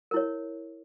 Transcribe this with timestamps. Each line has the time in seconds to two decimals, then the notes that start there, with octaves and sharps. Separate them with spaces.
0.11 A#4
0.14 E4
0.16 C#5